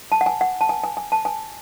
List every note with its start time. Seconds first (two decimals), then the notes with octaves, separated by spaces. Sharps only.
0.12 A5
0.21 F#5
0.26 G#5
0.41 F#5
0.61 A5
0.69 G#5
0.84 G#5
0.97 G#5
1.12 A5
1.25 G#5